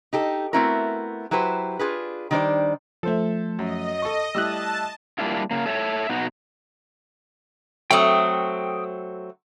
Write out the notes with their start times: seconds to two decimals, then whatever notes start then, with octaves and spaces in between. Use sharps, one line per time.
0.13 D#4 G4 A4
0.53 A3 B3 C4 E4 F#4 A#4
1.31 F#3 E4 G4 B4 C5
1.79 D4 F4 G#4 B4
2.31 D#3 G3 D4 A#4 C5 D5
3.03 F3 A3 A4 C5 E5
3.59 F#2 D#5
4.02 A4 C#6
4.35 G3 A3 E4 A5 E6 F#6
5.18 G3 A#3 D4 E4 F4
5.51 C#3 A#3
5.66 A4 C#5 E5
6.10 B2 D#4 F#4
7.91 F#3 A3 C4 G5 D#6